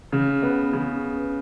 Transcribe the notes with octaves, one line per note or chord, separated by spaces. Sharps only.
C#3
B3
C#3